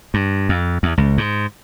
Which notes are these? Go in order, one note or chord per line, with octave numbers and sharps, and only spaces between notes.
G2
F2
E2
C#2
G#2